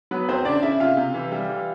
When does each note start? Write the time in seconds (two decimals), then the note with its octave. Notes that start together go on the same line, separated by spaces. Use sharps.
0.11 F#3 B3 B4
0.29 E2 C4 C5
0.45 C#3 D4 D5
0.62 C#3 E4 E5
0.80 C3 F4 F5
0.97 C3
1.14 E3
1.32 G3
1.49 E3